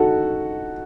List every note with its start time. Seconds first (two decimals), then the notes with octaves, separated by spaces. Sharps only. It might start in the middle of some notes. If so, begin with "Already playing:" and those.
Already playing: D#4 F#4 A4